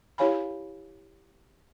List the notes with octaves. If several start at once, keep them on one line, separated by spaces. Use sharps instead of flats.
E4 G4 C#5 F5 G#5 B5